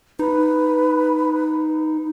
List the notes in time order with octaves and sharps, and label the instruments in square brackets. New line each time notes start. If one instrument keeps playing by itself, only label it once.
[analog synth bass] D#4 [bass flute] B4